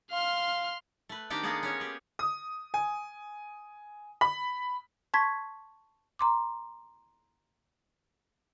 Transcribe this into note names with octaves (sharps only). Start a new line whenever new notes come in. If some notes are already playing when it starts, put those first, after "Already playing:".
F5 C6 F6
A3 B4
D#3 C4 D4 G4 A4 G5
G#3 A#3 B3 G#4 A4 F#5
C#4 C#5
G4 G#4
D#6
G#5
B5
A5 C6 C#6 G#6 B6
A#5 C6 D6